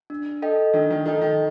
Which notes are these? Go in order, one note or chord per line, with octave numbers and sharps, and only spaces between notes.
D4
A4 D#5 G5
D#3 D4
D#3
D#3 A4 D#5 G5
D#3